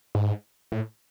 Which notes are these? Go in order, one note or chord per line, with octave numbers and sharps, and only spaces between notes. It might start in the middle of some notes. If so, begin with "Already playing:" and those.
G#2
A2